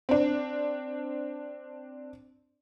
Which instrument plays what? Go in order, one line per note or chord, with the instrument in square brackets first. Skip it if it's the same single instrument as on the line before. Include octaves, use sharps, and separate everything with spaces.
[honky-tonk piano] C4 D4